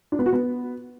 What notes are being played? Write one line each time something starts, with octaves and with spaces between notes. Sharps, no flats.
D4
B3
F#4
B3